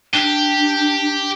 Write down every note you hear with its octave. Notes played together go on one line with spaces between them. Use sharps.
D4 G4